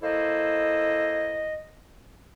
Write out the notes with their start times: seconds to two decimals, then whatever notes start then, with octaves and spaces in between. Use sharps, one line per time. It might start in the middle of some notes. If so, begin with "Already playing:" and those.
0.03 A#3 E4 A4 C5 D#5